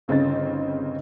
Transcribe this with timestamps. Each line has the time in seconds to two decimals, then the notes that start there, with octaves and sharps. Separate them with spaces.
0.08 G1 C#3 C4 D#4 A6